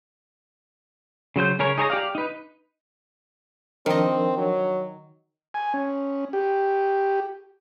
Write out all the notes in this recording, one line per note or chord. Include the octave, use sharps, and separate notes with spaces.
C#3 F#3 C5 G6
C#3 C#4 A#4 C#5
D#4 G#4 C#5 G#5 A#5
G4 D5 F5
D#4 B4
D#3 F3 C4 D4 A#4 D#5
F#3
G#5
C#4
G4